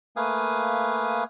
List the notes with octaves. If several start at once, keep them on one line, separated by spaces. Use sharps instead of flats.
A3 A#3 B4 F5 G#5 D#6